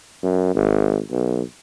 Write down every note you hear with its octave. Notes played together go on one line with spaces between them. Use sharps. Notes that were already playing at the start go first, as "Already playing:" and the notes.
F#2
G#1
B1